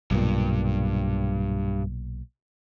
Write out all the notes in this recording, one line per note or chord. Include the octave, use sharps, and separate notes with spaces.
B1 G2 A#2